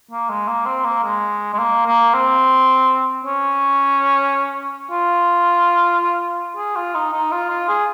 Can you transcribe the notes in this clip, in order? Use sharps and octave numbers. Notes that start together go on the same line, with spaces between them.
A#3
G#3
A#3
C4
A#3
G#3
G#3
A#3
A#3
C4
C#4
F4
G#4
F4
D#4
D#4
F4
F4
G#4